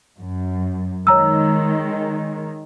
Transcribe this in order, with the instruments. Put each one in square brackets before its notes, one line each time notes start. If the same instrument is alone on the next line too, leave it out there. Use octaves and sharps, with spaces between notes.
[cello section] F#2
[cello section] D#3 G#3 [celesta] C#5 A#5 E6